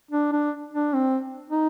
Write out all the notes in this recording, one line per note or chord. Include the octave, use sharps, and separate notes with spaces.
D4
D4
D4
C4
D#4